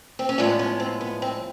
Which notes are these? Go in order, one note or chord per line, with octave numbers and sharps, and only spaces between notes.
C4
C#4
A2 F3 G#3 B3 D4
C#4
C4
B3
C4